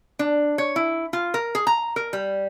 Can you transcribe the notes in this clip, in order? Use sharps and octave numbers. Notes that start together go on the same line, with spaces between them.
D4
C#5
E4
F4
A#4
G#4
A#5
A#4
G3